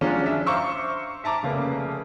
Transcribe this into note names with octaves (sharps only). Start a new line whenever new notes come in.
F3 F#3 G#3 C#4 D4
D4 E5
C5 F5 A#5 C#6 D6 E6
E5 A5 A#5 D6
F1 C#3 A#3 B4